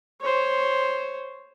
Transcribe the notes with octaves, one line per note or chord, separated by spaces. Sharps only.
C5 C#5